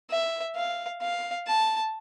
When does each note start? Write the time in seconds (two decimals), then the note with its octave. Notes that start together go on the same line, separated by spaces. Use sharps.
0.11 E5
0.56 F5
1.02 F5
1.47 A5